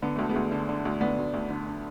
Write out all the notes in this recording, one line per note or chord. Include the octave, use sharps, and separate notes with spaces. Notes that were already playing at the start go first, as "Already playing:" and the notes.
D3 B3
D2 A3
G#3 B3
D2
D3
D3
D2
D2 B3 D4
D2
D2
D3
D3